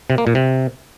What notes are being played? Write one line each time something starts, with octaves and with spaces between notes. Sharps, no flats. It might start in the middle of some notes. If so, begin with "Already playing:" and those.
C3
A#3
A#2
C3